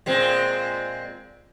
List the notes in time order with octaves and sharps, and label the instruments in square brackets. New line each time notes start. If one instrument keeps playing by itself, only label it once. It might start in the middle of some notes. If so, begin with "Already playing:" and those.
[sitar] A#2 G#3 C4